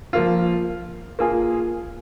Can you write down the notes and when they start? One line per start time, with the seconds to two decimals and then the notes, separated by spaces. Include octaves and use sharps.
0.13 F3 A#3 F4
1.19 A#3 F4 G#4